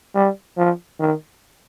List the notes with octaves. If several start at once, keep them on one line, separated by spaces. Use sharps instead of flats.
G3
F3
D#3